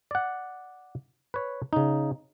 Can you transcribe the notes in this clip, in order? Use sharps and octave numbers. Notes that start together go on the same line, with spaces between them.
D5 F#5
B4 C#5
C#3 D#4